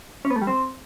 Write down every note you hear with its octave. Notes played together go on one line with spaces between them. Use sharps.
C#4
B3
A3
G3
C4